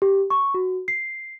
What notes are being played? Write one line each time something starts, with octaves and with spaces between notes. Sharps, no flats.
G4
C#6
F#4
C7